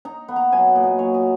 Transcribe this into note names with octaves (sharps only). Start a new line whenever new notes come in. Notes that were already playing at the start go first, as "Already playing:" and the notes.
D#4 A#5
B3
A#5
F#3 G#5
F#5
A#2
D#5
F#3 C#5
D#5